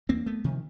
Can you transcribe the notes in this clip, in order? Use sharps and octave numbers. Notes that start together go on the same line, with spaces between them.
E2 A#3 C4
A3 B3
C3 D#3 F3